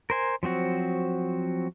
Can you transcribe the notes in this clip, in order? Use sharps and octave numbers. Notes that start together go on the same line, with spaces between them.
A#4 C5 G#5
F3 F#3 C4 F#4